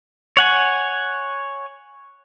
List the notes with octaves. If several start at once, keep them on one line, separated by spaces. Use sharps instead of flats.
C#5 F#5 G#5